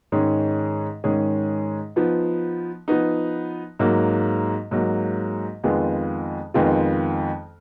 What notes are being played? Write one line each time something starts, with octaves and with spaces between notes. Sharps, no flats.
G#2 D#3 G#3 C#4 G#4
G#2 D#3 G#3 C#4 G#4
F3 B3 D#4
F3 B3 D#4
G#2 F#3 A#3
G#2 F#3 A#3
F2 D#3 G#3 B3 F4
F2 D#3 G#3 B3 F4